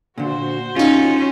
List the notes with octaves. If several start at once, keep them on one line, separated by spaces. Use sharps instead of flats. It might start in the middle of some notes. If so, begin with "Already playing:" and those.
A#2 D3 F#4 C5
C#3 C#4 D#4 F4